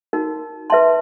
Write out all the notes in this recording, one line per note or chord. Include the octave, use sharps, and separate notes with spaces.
D#4 F#4 A#4
B4 E5 A5 C6